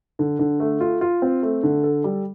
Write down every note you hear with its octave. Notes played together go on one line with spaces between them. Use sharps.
D3
D3
A3
F4
F4
C4
A3
D3
A4
G3